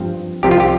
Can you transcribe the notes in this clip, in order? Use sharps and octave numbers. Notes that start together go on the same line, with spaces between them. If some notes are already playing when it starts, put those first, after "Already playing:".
Already playing: G2 F3 C4
C2 C3 F3 C4 G4
F4
G4